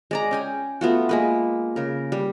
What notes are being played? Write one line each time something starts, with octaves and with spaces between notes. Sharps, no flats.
G#3 D5 A#5
C#4 G5 G#5
A3 B3 F4 F#4
G#3 A#3 B4
C#3 A#4
G3